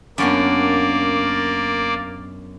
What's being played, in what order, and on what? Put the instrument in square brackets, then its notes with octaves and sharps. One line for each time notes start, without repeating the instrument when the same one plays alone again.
[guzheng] F#2 B3 D4 [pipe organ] A#3 D5